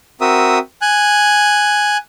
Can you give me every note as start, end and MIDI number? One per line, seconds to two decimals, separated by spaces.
0.21 0.59 60
0.21 0.59 66
0.21 0.59 70
0.21 0.59 76
0.21 0.59 87
0.82 1.97 80
0.82 1.97 90